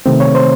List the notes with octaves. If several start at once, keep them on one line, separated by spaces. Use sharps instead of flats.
C3 D#3 A3 C4
C#5
C5